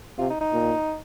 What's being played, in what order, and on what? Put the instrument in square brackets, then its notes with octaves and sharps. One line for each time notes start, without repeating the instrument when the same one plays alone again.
[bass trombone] C3 [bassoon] F4
[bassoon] D#4
D#4
[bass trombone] A#2